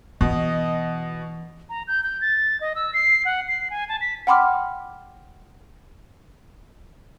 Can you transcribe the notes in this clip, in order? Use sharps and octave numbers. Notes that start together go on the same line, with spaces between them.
B2 E3 D#5
A#5
G6
G6
A6
D#5
E6
C7
F#5
C7
G#5
A5
B6
F#5 G5 B5 C6 D6 F6